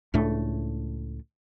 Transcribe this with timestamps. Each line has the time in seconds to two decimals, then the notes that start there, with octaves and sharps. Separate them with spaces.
0.14 C#2 A2 A3 D4